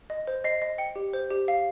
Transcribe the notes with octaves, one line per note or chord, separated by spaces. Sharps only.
D#5
C5
D#5 C7
D#5
G5 C#7
G4
C5
G4
F5